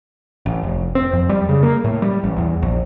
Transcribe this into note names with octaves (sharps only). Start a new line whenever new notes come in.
A1
F1
C4
F2
G3
C#3
A#3
A2
G3
A1
E2
A#1